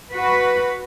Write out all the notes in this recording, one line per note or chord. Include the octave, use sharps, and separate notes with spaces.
F#4 B4